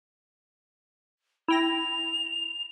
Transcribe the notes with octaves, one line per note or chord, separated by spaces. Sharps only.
E4 G5 A#6 F7